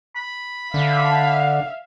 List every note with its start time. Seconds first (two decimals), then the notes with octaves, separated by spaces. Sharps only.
0.16 B5
0.74 D3 E5 F5